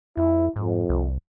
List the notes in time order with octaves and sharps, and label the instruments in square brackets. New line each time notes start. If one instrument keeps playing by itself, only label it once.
[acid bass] F2 [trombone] E4
[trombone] F2 [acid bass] G#2
[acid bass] C2